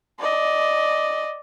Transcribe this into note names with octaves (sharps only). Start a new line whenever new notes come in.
D5 D#5